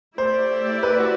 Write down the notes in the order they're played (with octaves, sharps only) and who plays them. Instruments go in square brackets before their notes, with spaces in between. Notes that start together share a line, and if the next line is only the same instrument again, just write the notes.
[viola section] A3 E4 G4 D5 [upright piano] C5
[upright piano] B4
F#4